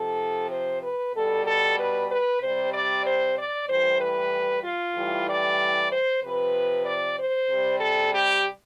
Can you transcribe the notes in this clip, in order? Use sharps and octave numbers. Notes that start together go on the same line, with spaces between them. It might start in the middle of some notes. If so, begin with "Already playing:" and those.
Already playing: C3 F3 A4
C5
B4
B2 G3 A4
A4
B4
B4
C3 G3 C5
D5
C5
D5
A2 E3 G3 C5
B4
F4
A2 E3 G3
D5
C5
C3 F3 B4
D5
C5
C3 G3
A4
G4